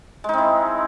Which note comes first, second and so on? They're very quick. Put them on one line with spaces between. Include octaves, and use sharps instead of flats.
G#3 D#4 C4 E4